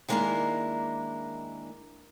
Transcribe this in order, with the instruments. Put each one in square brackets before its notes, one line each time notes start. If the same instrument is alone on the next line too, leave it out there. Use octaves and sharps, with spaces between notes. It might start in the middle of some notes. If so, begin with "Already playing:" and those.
[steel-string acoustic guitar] D#3 G#3 A#3 D4 E4 A#4